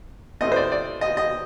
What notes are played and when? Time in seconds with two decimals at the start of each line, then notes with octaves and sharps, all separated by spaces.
0.41 A2 A3 C4 D#5
0.52 C5
0.56 D5
0.72 D5
1.01 D#5
1.17 D#5